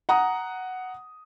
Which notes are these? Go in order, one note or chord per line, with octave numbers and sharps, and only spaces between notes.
F#5 A#5 D#6